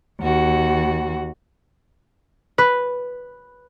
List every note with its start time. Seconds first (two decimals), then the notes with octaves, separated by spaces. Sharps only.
0.19 D#2 F#4
2.58 B4